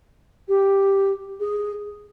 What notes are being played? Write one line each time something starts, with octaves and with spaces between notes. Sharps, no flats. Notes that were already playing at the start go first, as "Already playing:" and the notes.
G4
G#4